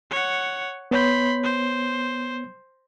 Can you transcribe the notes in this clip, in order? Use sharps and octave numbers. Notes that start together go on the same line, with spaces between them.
C#5 F#5
B3 C#5 B5 C6 G6
C5